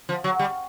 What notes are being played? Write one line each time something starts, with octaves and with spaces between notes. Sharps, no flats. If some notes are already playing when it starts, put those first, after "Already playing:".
F3
F#3
G3